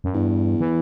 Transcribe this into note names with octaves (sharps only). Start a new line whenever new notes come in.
F#2
E2 G2
E3